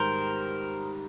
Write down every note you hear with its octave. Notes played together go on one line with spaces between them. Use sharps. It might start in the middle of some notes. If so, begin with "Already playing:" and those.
Already playing: G#2 D#3 G3 A#4 C5